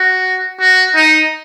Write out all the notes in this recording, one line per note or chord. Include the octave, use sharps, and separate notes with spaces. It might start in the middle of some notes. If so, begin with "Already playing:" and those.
Already playing: F#4
F#4
D#4